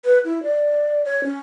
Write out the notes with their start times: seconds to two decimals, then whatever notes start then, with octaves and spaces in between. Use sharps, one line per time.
0.05 B4
0.25 E4
0.43 D5
1.05 C#5
1.24 C#4